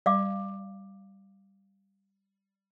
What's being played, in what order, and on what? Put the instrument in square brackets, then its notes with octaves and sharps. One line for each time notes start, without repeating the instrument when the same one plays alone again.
[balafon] G3 [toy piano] D5 F5 D6